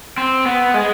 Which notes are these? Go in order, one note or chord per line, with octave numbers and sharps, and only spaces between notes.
C4
B3
G#3